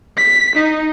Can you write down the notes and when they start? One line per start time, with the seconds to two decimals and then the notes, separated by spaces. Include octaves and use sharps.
0.17 B6
0.56 D#4